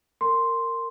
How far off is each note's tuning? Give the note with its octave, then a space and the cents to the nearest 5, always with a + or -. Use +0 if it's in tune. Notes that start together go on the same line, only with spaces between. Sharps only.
A#4 -20 C6 +0